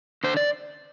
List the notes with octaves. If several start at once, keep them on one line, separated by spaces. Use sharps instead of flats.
D3 C5
D5